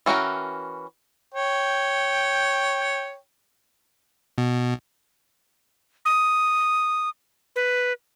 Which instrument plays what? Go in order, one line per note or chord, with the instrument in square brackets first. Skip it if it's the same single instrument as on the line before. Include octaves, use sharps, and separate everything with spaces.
[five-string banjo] E3 C#4 F#4 A#4 G5
[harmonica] C#5 G5
[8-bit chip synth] B2
[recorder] D#6
B4